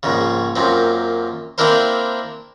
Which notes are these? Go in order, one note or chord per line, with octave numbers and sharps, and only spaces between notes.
A#1 G#2 C#3
F#2 A#2 C4
A#3 C4 D4 E4 A#4 C5